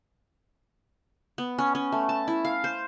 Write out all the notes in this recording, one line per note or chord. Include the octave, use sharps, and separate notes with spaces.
B3
C#4
C#4
A3
A5
E4
F5
C5